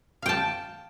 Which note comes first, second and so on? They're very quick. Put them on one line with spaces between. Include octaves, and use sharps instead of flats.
F5 G5 A5